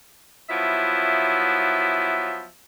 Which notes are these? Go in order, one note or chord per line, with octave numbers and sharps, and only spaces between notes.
F3 F#3 B3 E4 E5